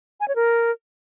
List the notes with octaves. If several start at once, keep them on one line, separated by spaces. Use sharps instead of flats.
G#5
C#5
A#4